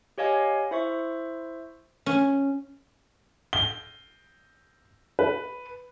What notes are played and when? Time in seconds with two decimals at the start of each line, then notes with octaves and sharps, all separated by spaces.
0.18 G4 C#5 D#5 F5 G#5
0.71 E4 C5 E5 C#6
2.06 C#4
3.53 G7
5.19 B4